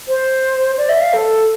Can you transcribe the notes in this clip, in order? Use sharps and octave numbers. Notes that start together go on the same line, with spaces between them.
C5
D5
E5
F5
A4